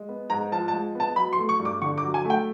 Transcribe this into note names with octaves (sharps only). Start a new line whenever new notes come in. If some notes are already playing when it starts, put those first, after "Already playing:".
Already playing: G#3
B3
G#2 A#5
F3 A5
A5
G#3
B3 A5
F#3 B5
C6
A3
C#6
G2
D6
D3 C#6
D6
F#3
G#5
A3
G5